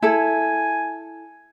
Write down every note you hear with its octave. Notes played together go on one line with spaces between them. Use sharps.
E4 A4 G#5